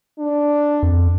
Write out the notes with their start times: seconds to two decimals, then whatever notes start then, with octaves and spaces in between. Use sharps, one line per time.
0.19 D4
0.83 F2